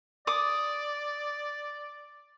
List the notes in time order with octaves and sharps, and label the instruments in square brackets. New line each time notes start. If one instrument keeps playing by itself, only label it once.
[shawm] D5 [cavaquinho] D6 D#6